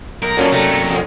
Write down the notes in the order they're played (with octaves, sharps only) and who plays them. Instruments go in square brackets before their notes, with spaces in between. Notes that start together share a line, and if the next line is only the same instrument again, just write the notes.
[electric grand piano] B1 [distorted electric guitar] A#4
[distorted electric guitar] F#2 [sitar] D3 D4 F4 [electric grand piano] F#3 A#3 C#4
[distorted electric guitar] C3 D#4 [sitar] A3
[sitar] F2